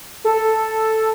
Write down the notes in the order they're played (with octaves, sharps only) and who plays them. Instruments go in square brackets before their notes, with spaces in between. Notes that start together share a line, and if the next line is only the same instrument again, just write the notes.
[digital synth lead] A4